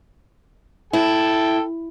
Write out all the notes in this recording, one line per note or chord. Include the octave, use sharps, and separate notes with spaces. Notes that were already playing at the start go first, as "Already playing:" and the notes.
E4 A4 G5 A5